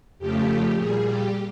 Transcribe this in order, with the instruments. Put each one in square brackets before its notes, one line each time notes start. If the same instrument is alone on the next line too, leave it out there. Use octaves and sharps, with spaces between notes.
[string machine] F2 C#3 F3 A3 G4
A#2 G3 G#4
G4